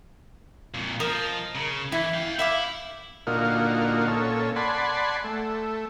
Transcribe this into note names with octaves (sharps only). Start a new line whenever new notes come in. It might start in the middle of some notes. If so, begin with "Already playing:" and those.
F2 A#2
F3 A#4 D#5 A#5
C#3
E3 E4
F5 G5
E4 E5 F5 D6
A#2 D3 A#3 D#4 F4 F#4
A#2 C#4 A4
D5 F#5 G#5 A5 B5 C6
A3